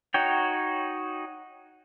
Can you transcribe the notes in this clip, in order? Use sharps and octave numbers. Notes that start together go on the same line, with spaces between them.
D#4 F#4 C#5 G5